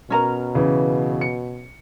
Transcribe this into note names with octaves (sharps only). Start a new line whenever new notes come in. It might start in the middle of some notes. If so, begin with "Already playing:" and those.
B2 C#4 A#4 A#5
C#3 E3
C#7